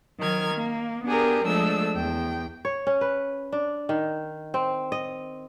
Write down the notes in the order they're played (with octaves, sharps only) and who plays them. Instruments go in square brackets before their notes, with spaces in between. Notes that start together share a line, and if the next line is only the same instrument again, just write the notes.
[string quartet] D#3 F#3 A#4 F6 G#6
A#3
B3 D4 G4 G#4 A#4
F3 G#3 A3 D4 E6
E2 G5
[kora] C#5
C#4
B4
D4
D#3
C4
D#5